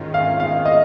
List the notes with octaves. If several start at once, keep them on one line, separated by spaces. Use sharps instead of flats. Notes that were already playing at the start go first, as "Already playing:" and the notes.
Already playing: G#2 D#3 G#3 C#4 F4
F5
F5
D#5